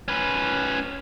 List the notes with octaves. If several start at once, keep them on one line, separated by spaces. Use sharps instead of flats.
C#4 B4